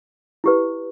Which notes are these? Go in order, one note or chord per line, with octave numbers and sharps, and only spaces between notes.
E4 G4 B4